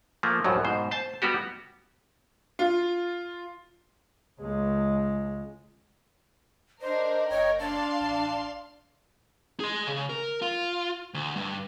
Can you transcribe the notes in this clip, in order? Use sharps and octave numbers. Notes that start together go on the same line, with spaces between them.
F3 A3 A#3
C2 F#2 A2 F3 F#3
G#2 B2 C5
C5 A5
G3 B3 F#4 G4
F4
C#2 G#3
D4 A#4 C5 D#5
F#1 A#4 C#5 D#5 G5
D4 D5 F5 A5 C6
A1
G#4 C6
C#3
A#4
F4
D2
G2